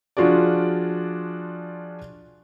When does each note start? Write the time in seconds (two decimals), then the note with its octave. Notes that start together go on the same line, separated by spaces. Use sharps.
0.17 F3 D4 F4 F#4 G#4 D5